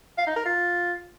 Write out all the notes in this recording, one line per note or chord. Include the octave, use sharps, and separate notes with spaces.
F5
D#4
A#4
F4